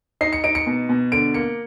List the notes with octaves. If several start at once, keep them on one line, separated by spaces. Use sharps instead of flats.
D#4 C7
C#7
D#4 D7
C#7
B2
B2
D3 D7
A#3 C#7